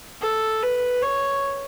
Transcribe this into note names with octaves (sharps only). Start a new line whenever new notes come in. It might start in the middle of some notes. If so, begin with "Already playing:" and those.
A4
B4
C#5